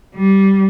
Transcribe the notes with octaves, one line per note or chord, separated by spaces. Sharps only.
G3